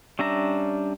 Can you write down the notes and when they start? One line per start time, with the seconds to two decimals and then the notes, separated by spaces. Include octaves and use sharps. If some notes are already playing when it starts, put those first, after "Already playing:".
0.19 G3 C#4 D4 E5 A#5